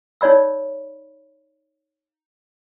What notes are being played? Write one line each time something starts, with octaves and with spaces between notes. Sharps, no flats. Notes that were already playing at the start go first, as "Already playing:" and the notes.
D#4 C#5 D5 B5 E6